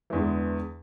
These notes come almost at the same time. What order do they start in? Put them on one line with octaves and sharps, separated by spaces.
E3 E2 D3 G#3